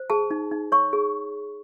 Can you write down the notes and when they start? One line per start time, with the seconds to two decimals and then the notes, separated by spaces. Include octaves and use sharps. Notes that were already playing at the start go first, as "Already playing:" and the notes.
Already playing: C5
0.10 G#4 A5
0.31 D#4
0.52 D#4
0.72 C#5 C#6
0.93 G#4